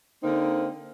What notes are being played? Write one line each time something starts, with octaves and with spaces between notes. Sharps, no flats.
D3 A#3 C4 D#4